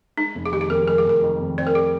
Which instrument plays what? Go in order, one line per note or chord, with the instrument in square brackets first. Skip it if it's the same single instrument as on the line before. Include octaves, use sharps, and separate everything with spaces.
[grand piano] G#3 [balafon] D#4
[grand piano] F1
[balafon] G#4
[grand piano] D#3 [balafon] G4
[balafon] G#4
[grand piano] F2 [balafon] A#4
[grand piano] G#3 [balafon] A#4
[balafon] G#4
[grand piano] F1 [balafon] A#4
[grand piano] D#3
F2
[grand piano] C4 [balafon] D5
[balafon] A#4
G#4